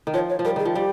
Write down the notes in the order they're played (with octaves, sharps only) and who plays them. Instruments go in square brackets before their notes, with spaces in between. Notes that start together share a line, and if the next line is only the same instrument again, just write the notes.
[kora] D#3
[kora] F3 [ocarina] C#5
[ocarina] C#5
[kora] F3
[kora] G3 [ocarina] A#4
[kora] D#3 [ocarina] G#4
[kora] F3
[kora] G3 [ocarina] G4